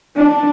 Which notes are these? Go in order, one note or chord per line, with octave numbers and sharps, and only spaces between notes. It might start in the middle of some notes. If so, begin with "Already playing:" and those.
D4